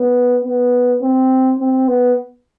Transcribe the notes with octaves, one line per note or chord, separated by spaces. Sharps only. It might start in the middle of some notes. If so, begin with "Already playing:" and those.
Already playing: B3
B3
C4
C4
B3